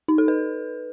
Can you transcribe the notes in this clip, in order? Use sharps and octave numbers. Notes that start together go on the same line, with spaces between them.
D#4
A4
B4